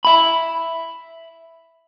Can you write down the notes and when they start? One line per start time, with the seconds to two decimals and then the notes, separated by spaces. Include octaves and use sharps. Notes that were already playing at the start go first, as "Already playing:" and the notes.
0.05 E5 B5